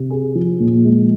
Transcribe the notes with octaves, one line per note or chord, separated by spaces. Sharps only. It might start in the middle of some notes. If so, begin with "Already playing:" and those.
Already playing: C3
G#4
F3
A#2
G#3